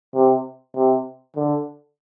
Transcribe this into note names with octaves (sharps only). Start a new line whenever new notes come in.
C3
C3
D3